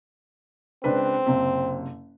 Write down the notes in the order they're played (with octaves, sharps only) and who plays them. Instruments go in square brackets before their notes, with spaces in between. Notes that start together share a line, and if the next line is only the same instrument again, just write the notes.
[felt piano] C#2 D4 B4 [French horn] C4
[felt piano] F#1 C3